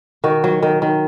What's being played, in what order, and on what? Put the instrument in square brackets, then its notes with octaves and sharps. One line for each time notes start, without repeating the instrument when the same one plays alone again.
[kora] D#3 F#4
F#3
D#3
D#3